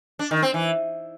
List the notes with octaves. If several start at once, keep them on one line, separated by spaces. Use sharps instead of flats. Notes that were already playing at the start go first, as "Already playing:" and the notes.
D4
D#3
C4
E3